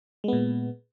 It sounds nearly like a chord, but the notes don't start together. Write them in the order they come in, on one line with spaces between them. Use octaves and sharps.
G#3 B3 A#2